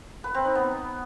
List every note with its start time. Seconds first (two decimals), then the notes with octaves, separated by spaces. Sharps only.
0.24 B4
0.34 C4
0.45 D#4
0.55 B3